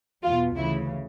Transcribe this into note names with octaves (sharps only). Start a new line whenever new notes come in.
E2 B2 F4
D2 C#3 E3 E4